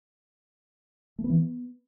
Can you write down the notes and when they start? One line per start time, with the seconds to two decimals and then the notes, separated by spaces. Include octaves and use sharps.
1.19 A3
1.24 B3
1.30 E3
1.35 B3